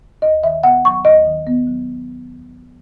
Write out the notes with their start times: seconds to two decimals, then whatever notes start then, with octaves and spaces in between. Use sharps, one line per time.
0.22 D#2 D#5
0.43 D#3 E5
0.63 B3 F#5
0.85 F#3 C#6
1.05 D#2 D#5
1.26 D#3
1.47 B3
1.67 F#3